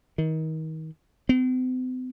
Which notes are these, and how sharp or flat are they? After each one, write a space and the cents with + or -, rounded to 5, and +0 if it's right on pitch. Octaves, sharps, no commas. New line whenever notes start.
D#3 +30
C4 -45